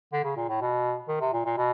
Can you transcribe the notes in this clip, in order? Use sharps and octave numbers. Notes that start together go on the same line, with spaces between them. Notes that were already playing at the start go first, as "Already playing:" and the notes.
D3
C#3
A#2
A2
B2
D#3
C3
A#2
A#2
B2